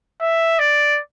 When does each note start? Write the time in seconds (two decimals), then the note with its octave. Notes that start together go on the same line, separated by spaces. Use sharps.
0.21 E5
0.59 D5